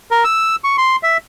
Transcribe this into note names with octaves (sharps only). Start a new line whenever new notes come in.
A#4
E6
C#6
C6
E5